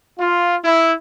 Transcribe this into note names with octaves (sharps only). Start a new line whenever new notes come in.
F4
E4